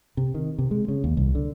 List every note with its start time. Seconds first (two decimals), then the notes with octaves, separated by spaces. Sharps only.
0.17 C3
0.34 D#3
0.59 C3
0.71 G#3
0.88 C#3
1.04 D#2
1.17 C2
1.35 D3